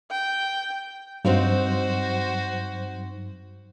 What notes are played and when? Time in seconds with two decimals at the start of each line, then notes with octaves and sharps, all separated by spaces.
0.11 G5
1.25 G2 F#3 C4 D#4 F#4 C5 F5